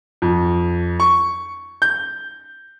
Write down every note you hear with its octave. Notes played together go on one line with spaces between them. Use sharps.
F2
C#6
G6